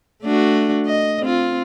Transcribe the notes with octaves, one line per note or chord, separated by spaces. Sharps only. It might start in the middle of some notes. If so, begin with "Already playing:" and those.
A3 D4 F#4
D#5
C4 F4